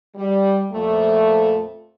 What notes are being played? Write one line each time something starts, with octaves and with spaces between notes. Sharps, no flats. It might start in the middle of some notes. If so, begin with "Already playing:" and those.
G3
F2 A#2 F3 A3